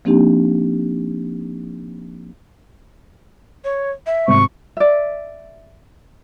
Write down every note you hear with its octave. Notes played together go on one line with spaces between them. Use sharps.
F3 A#3 C4 D4 D#4 G4
C#5
E5
G#1 C3 C4 C#6
D5 E5